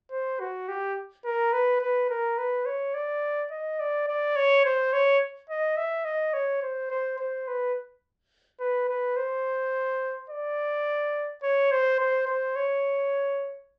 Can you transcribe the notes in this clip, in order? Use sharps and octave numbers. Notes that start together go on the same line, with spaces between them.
C5
F#4
G4
A#4
B4
B4
A#4
B4
C#5
D5
D#5
D5
D5
C#5
C5
C#5
D#5
E5
D#5
C#5
C5
C5
C5
B4
B4
B4
C5
D5
C#5
C5
C5
C5
C#5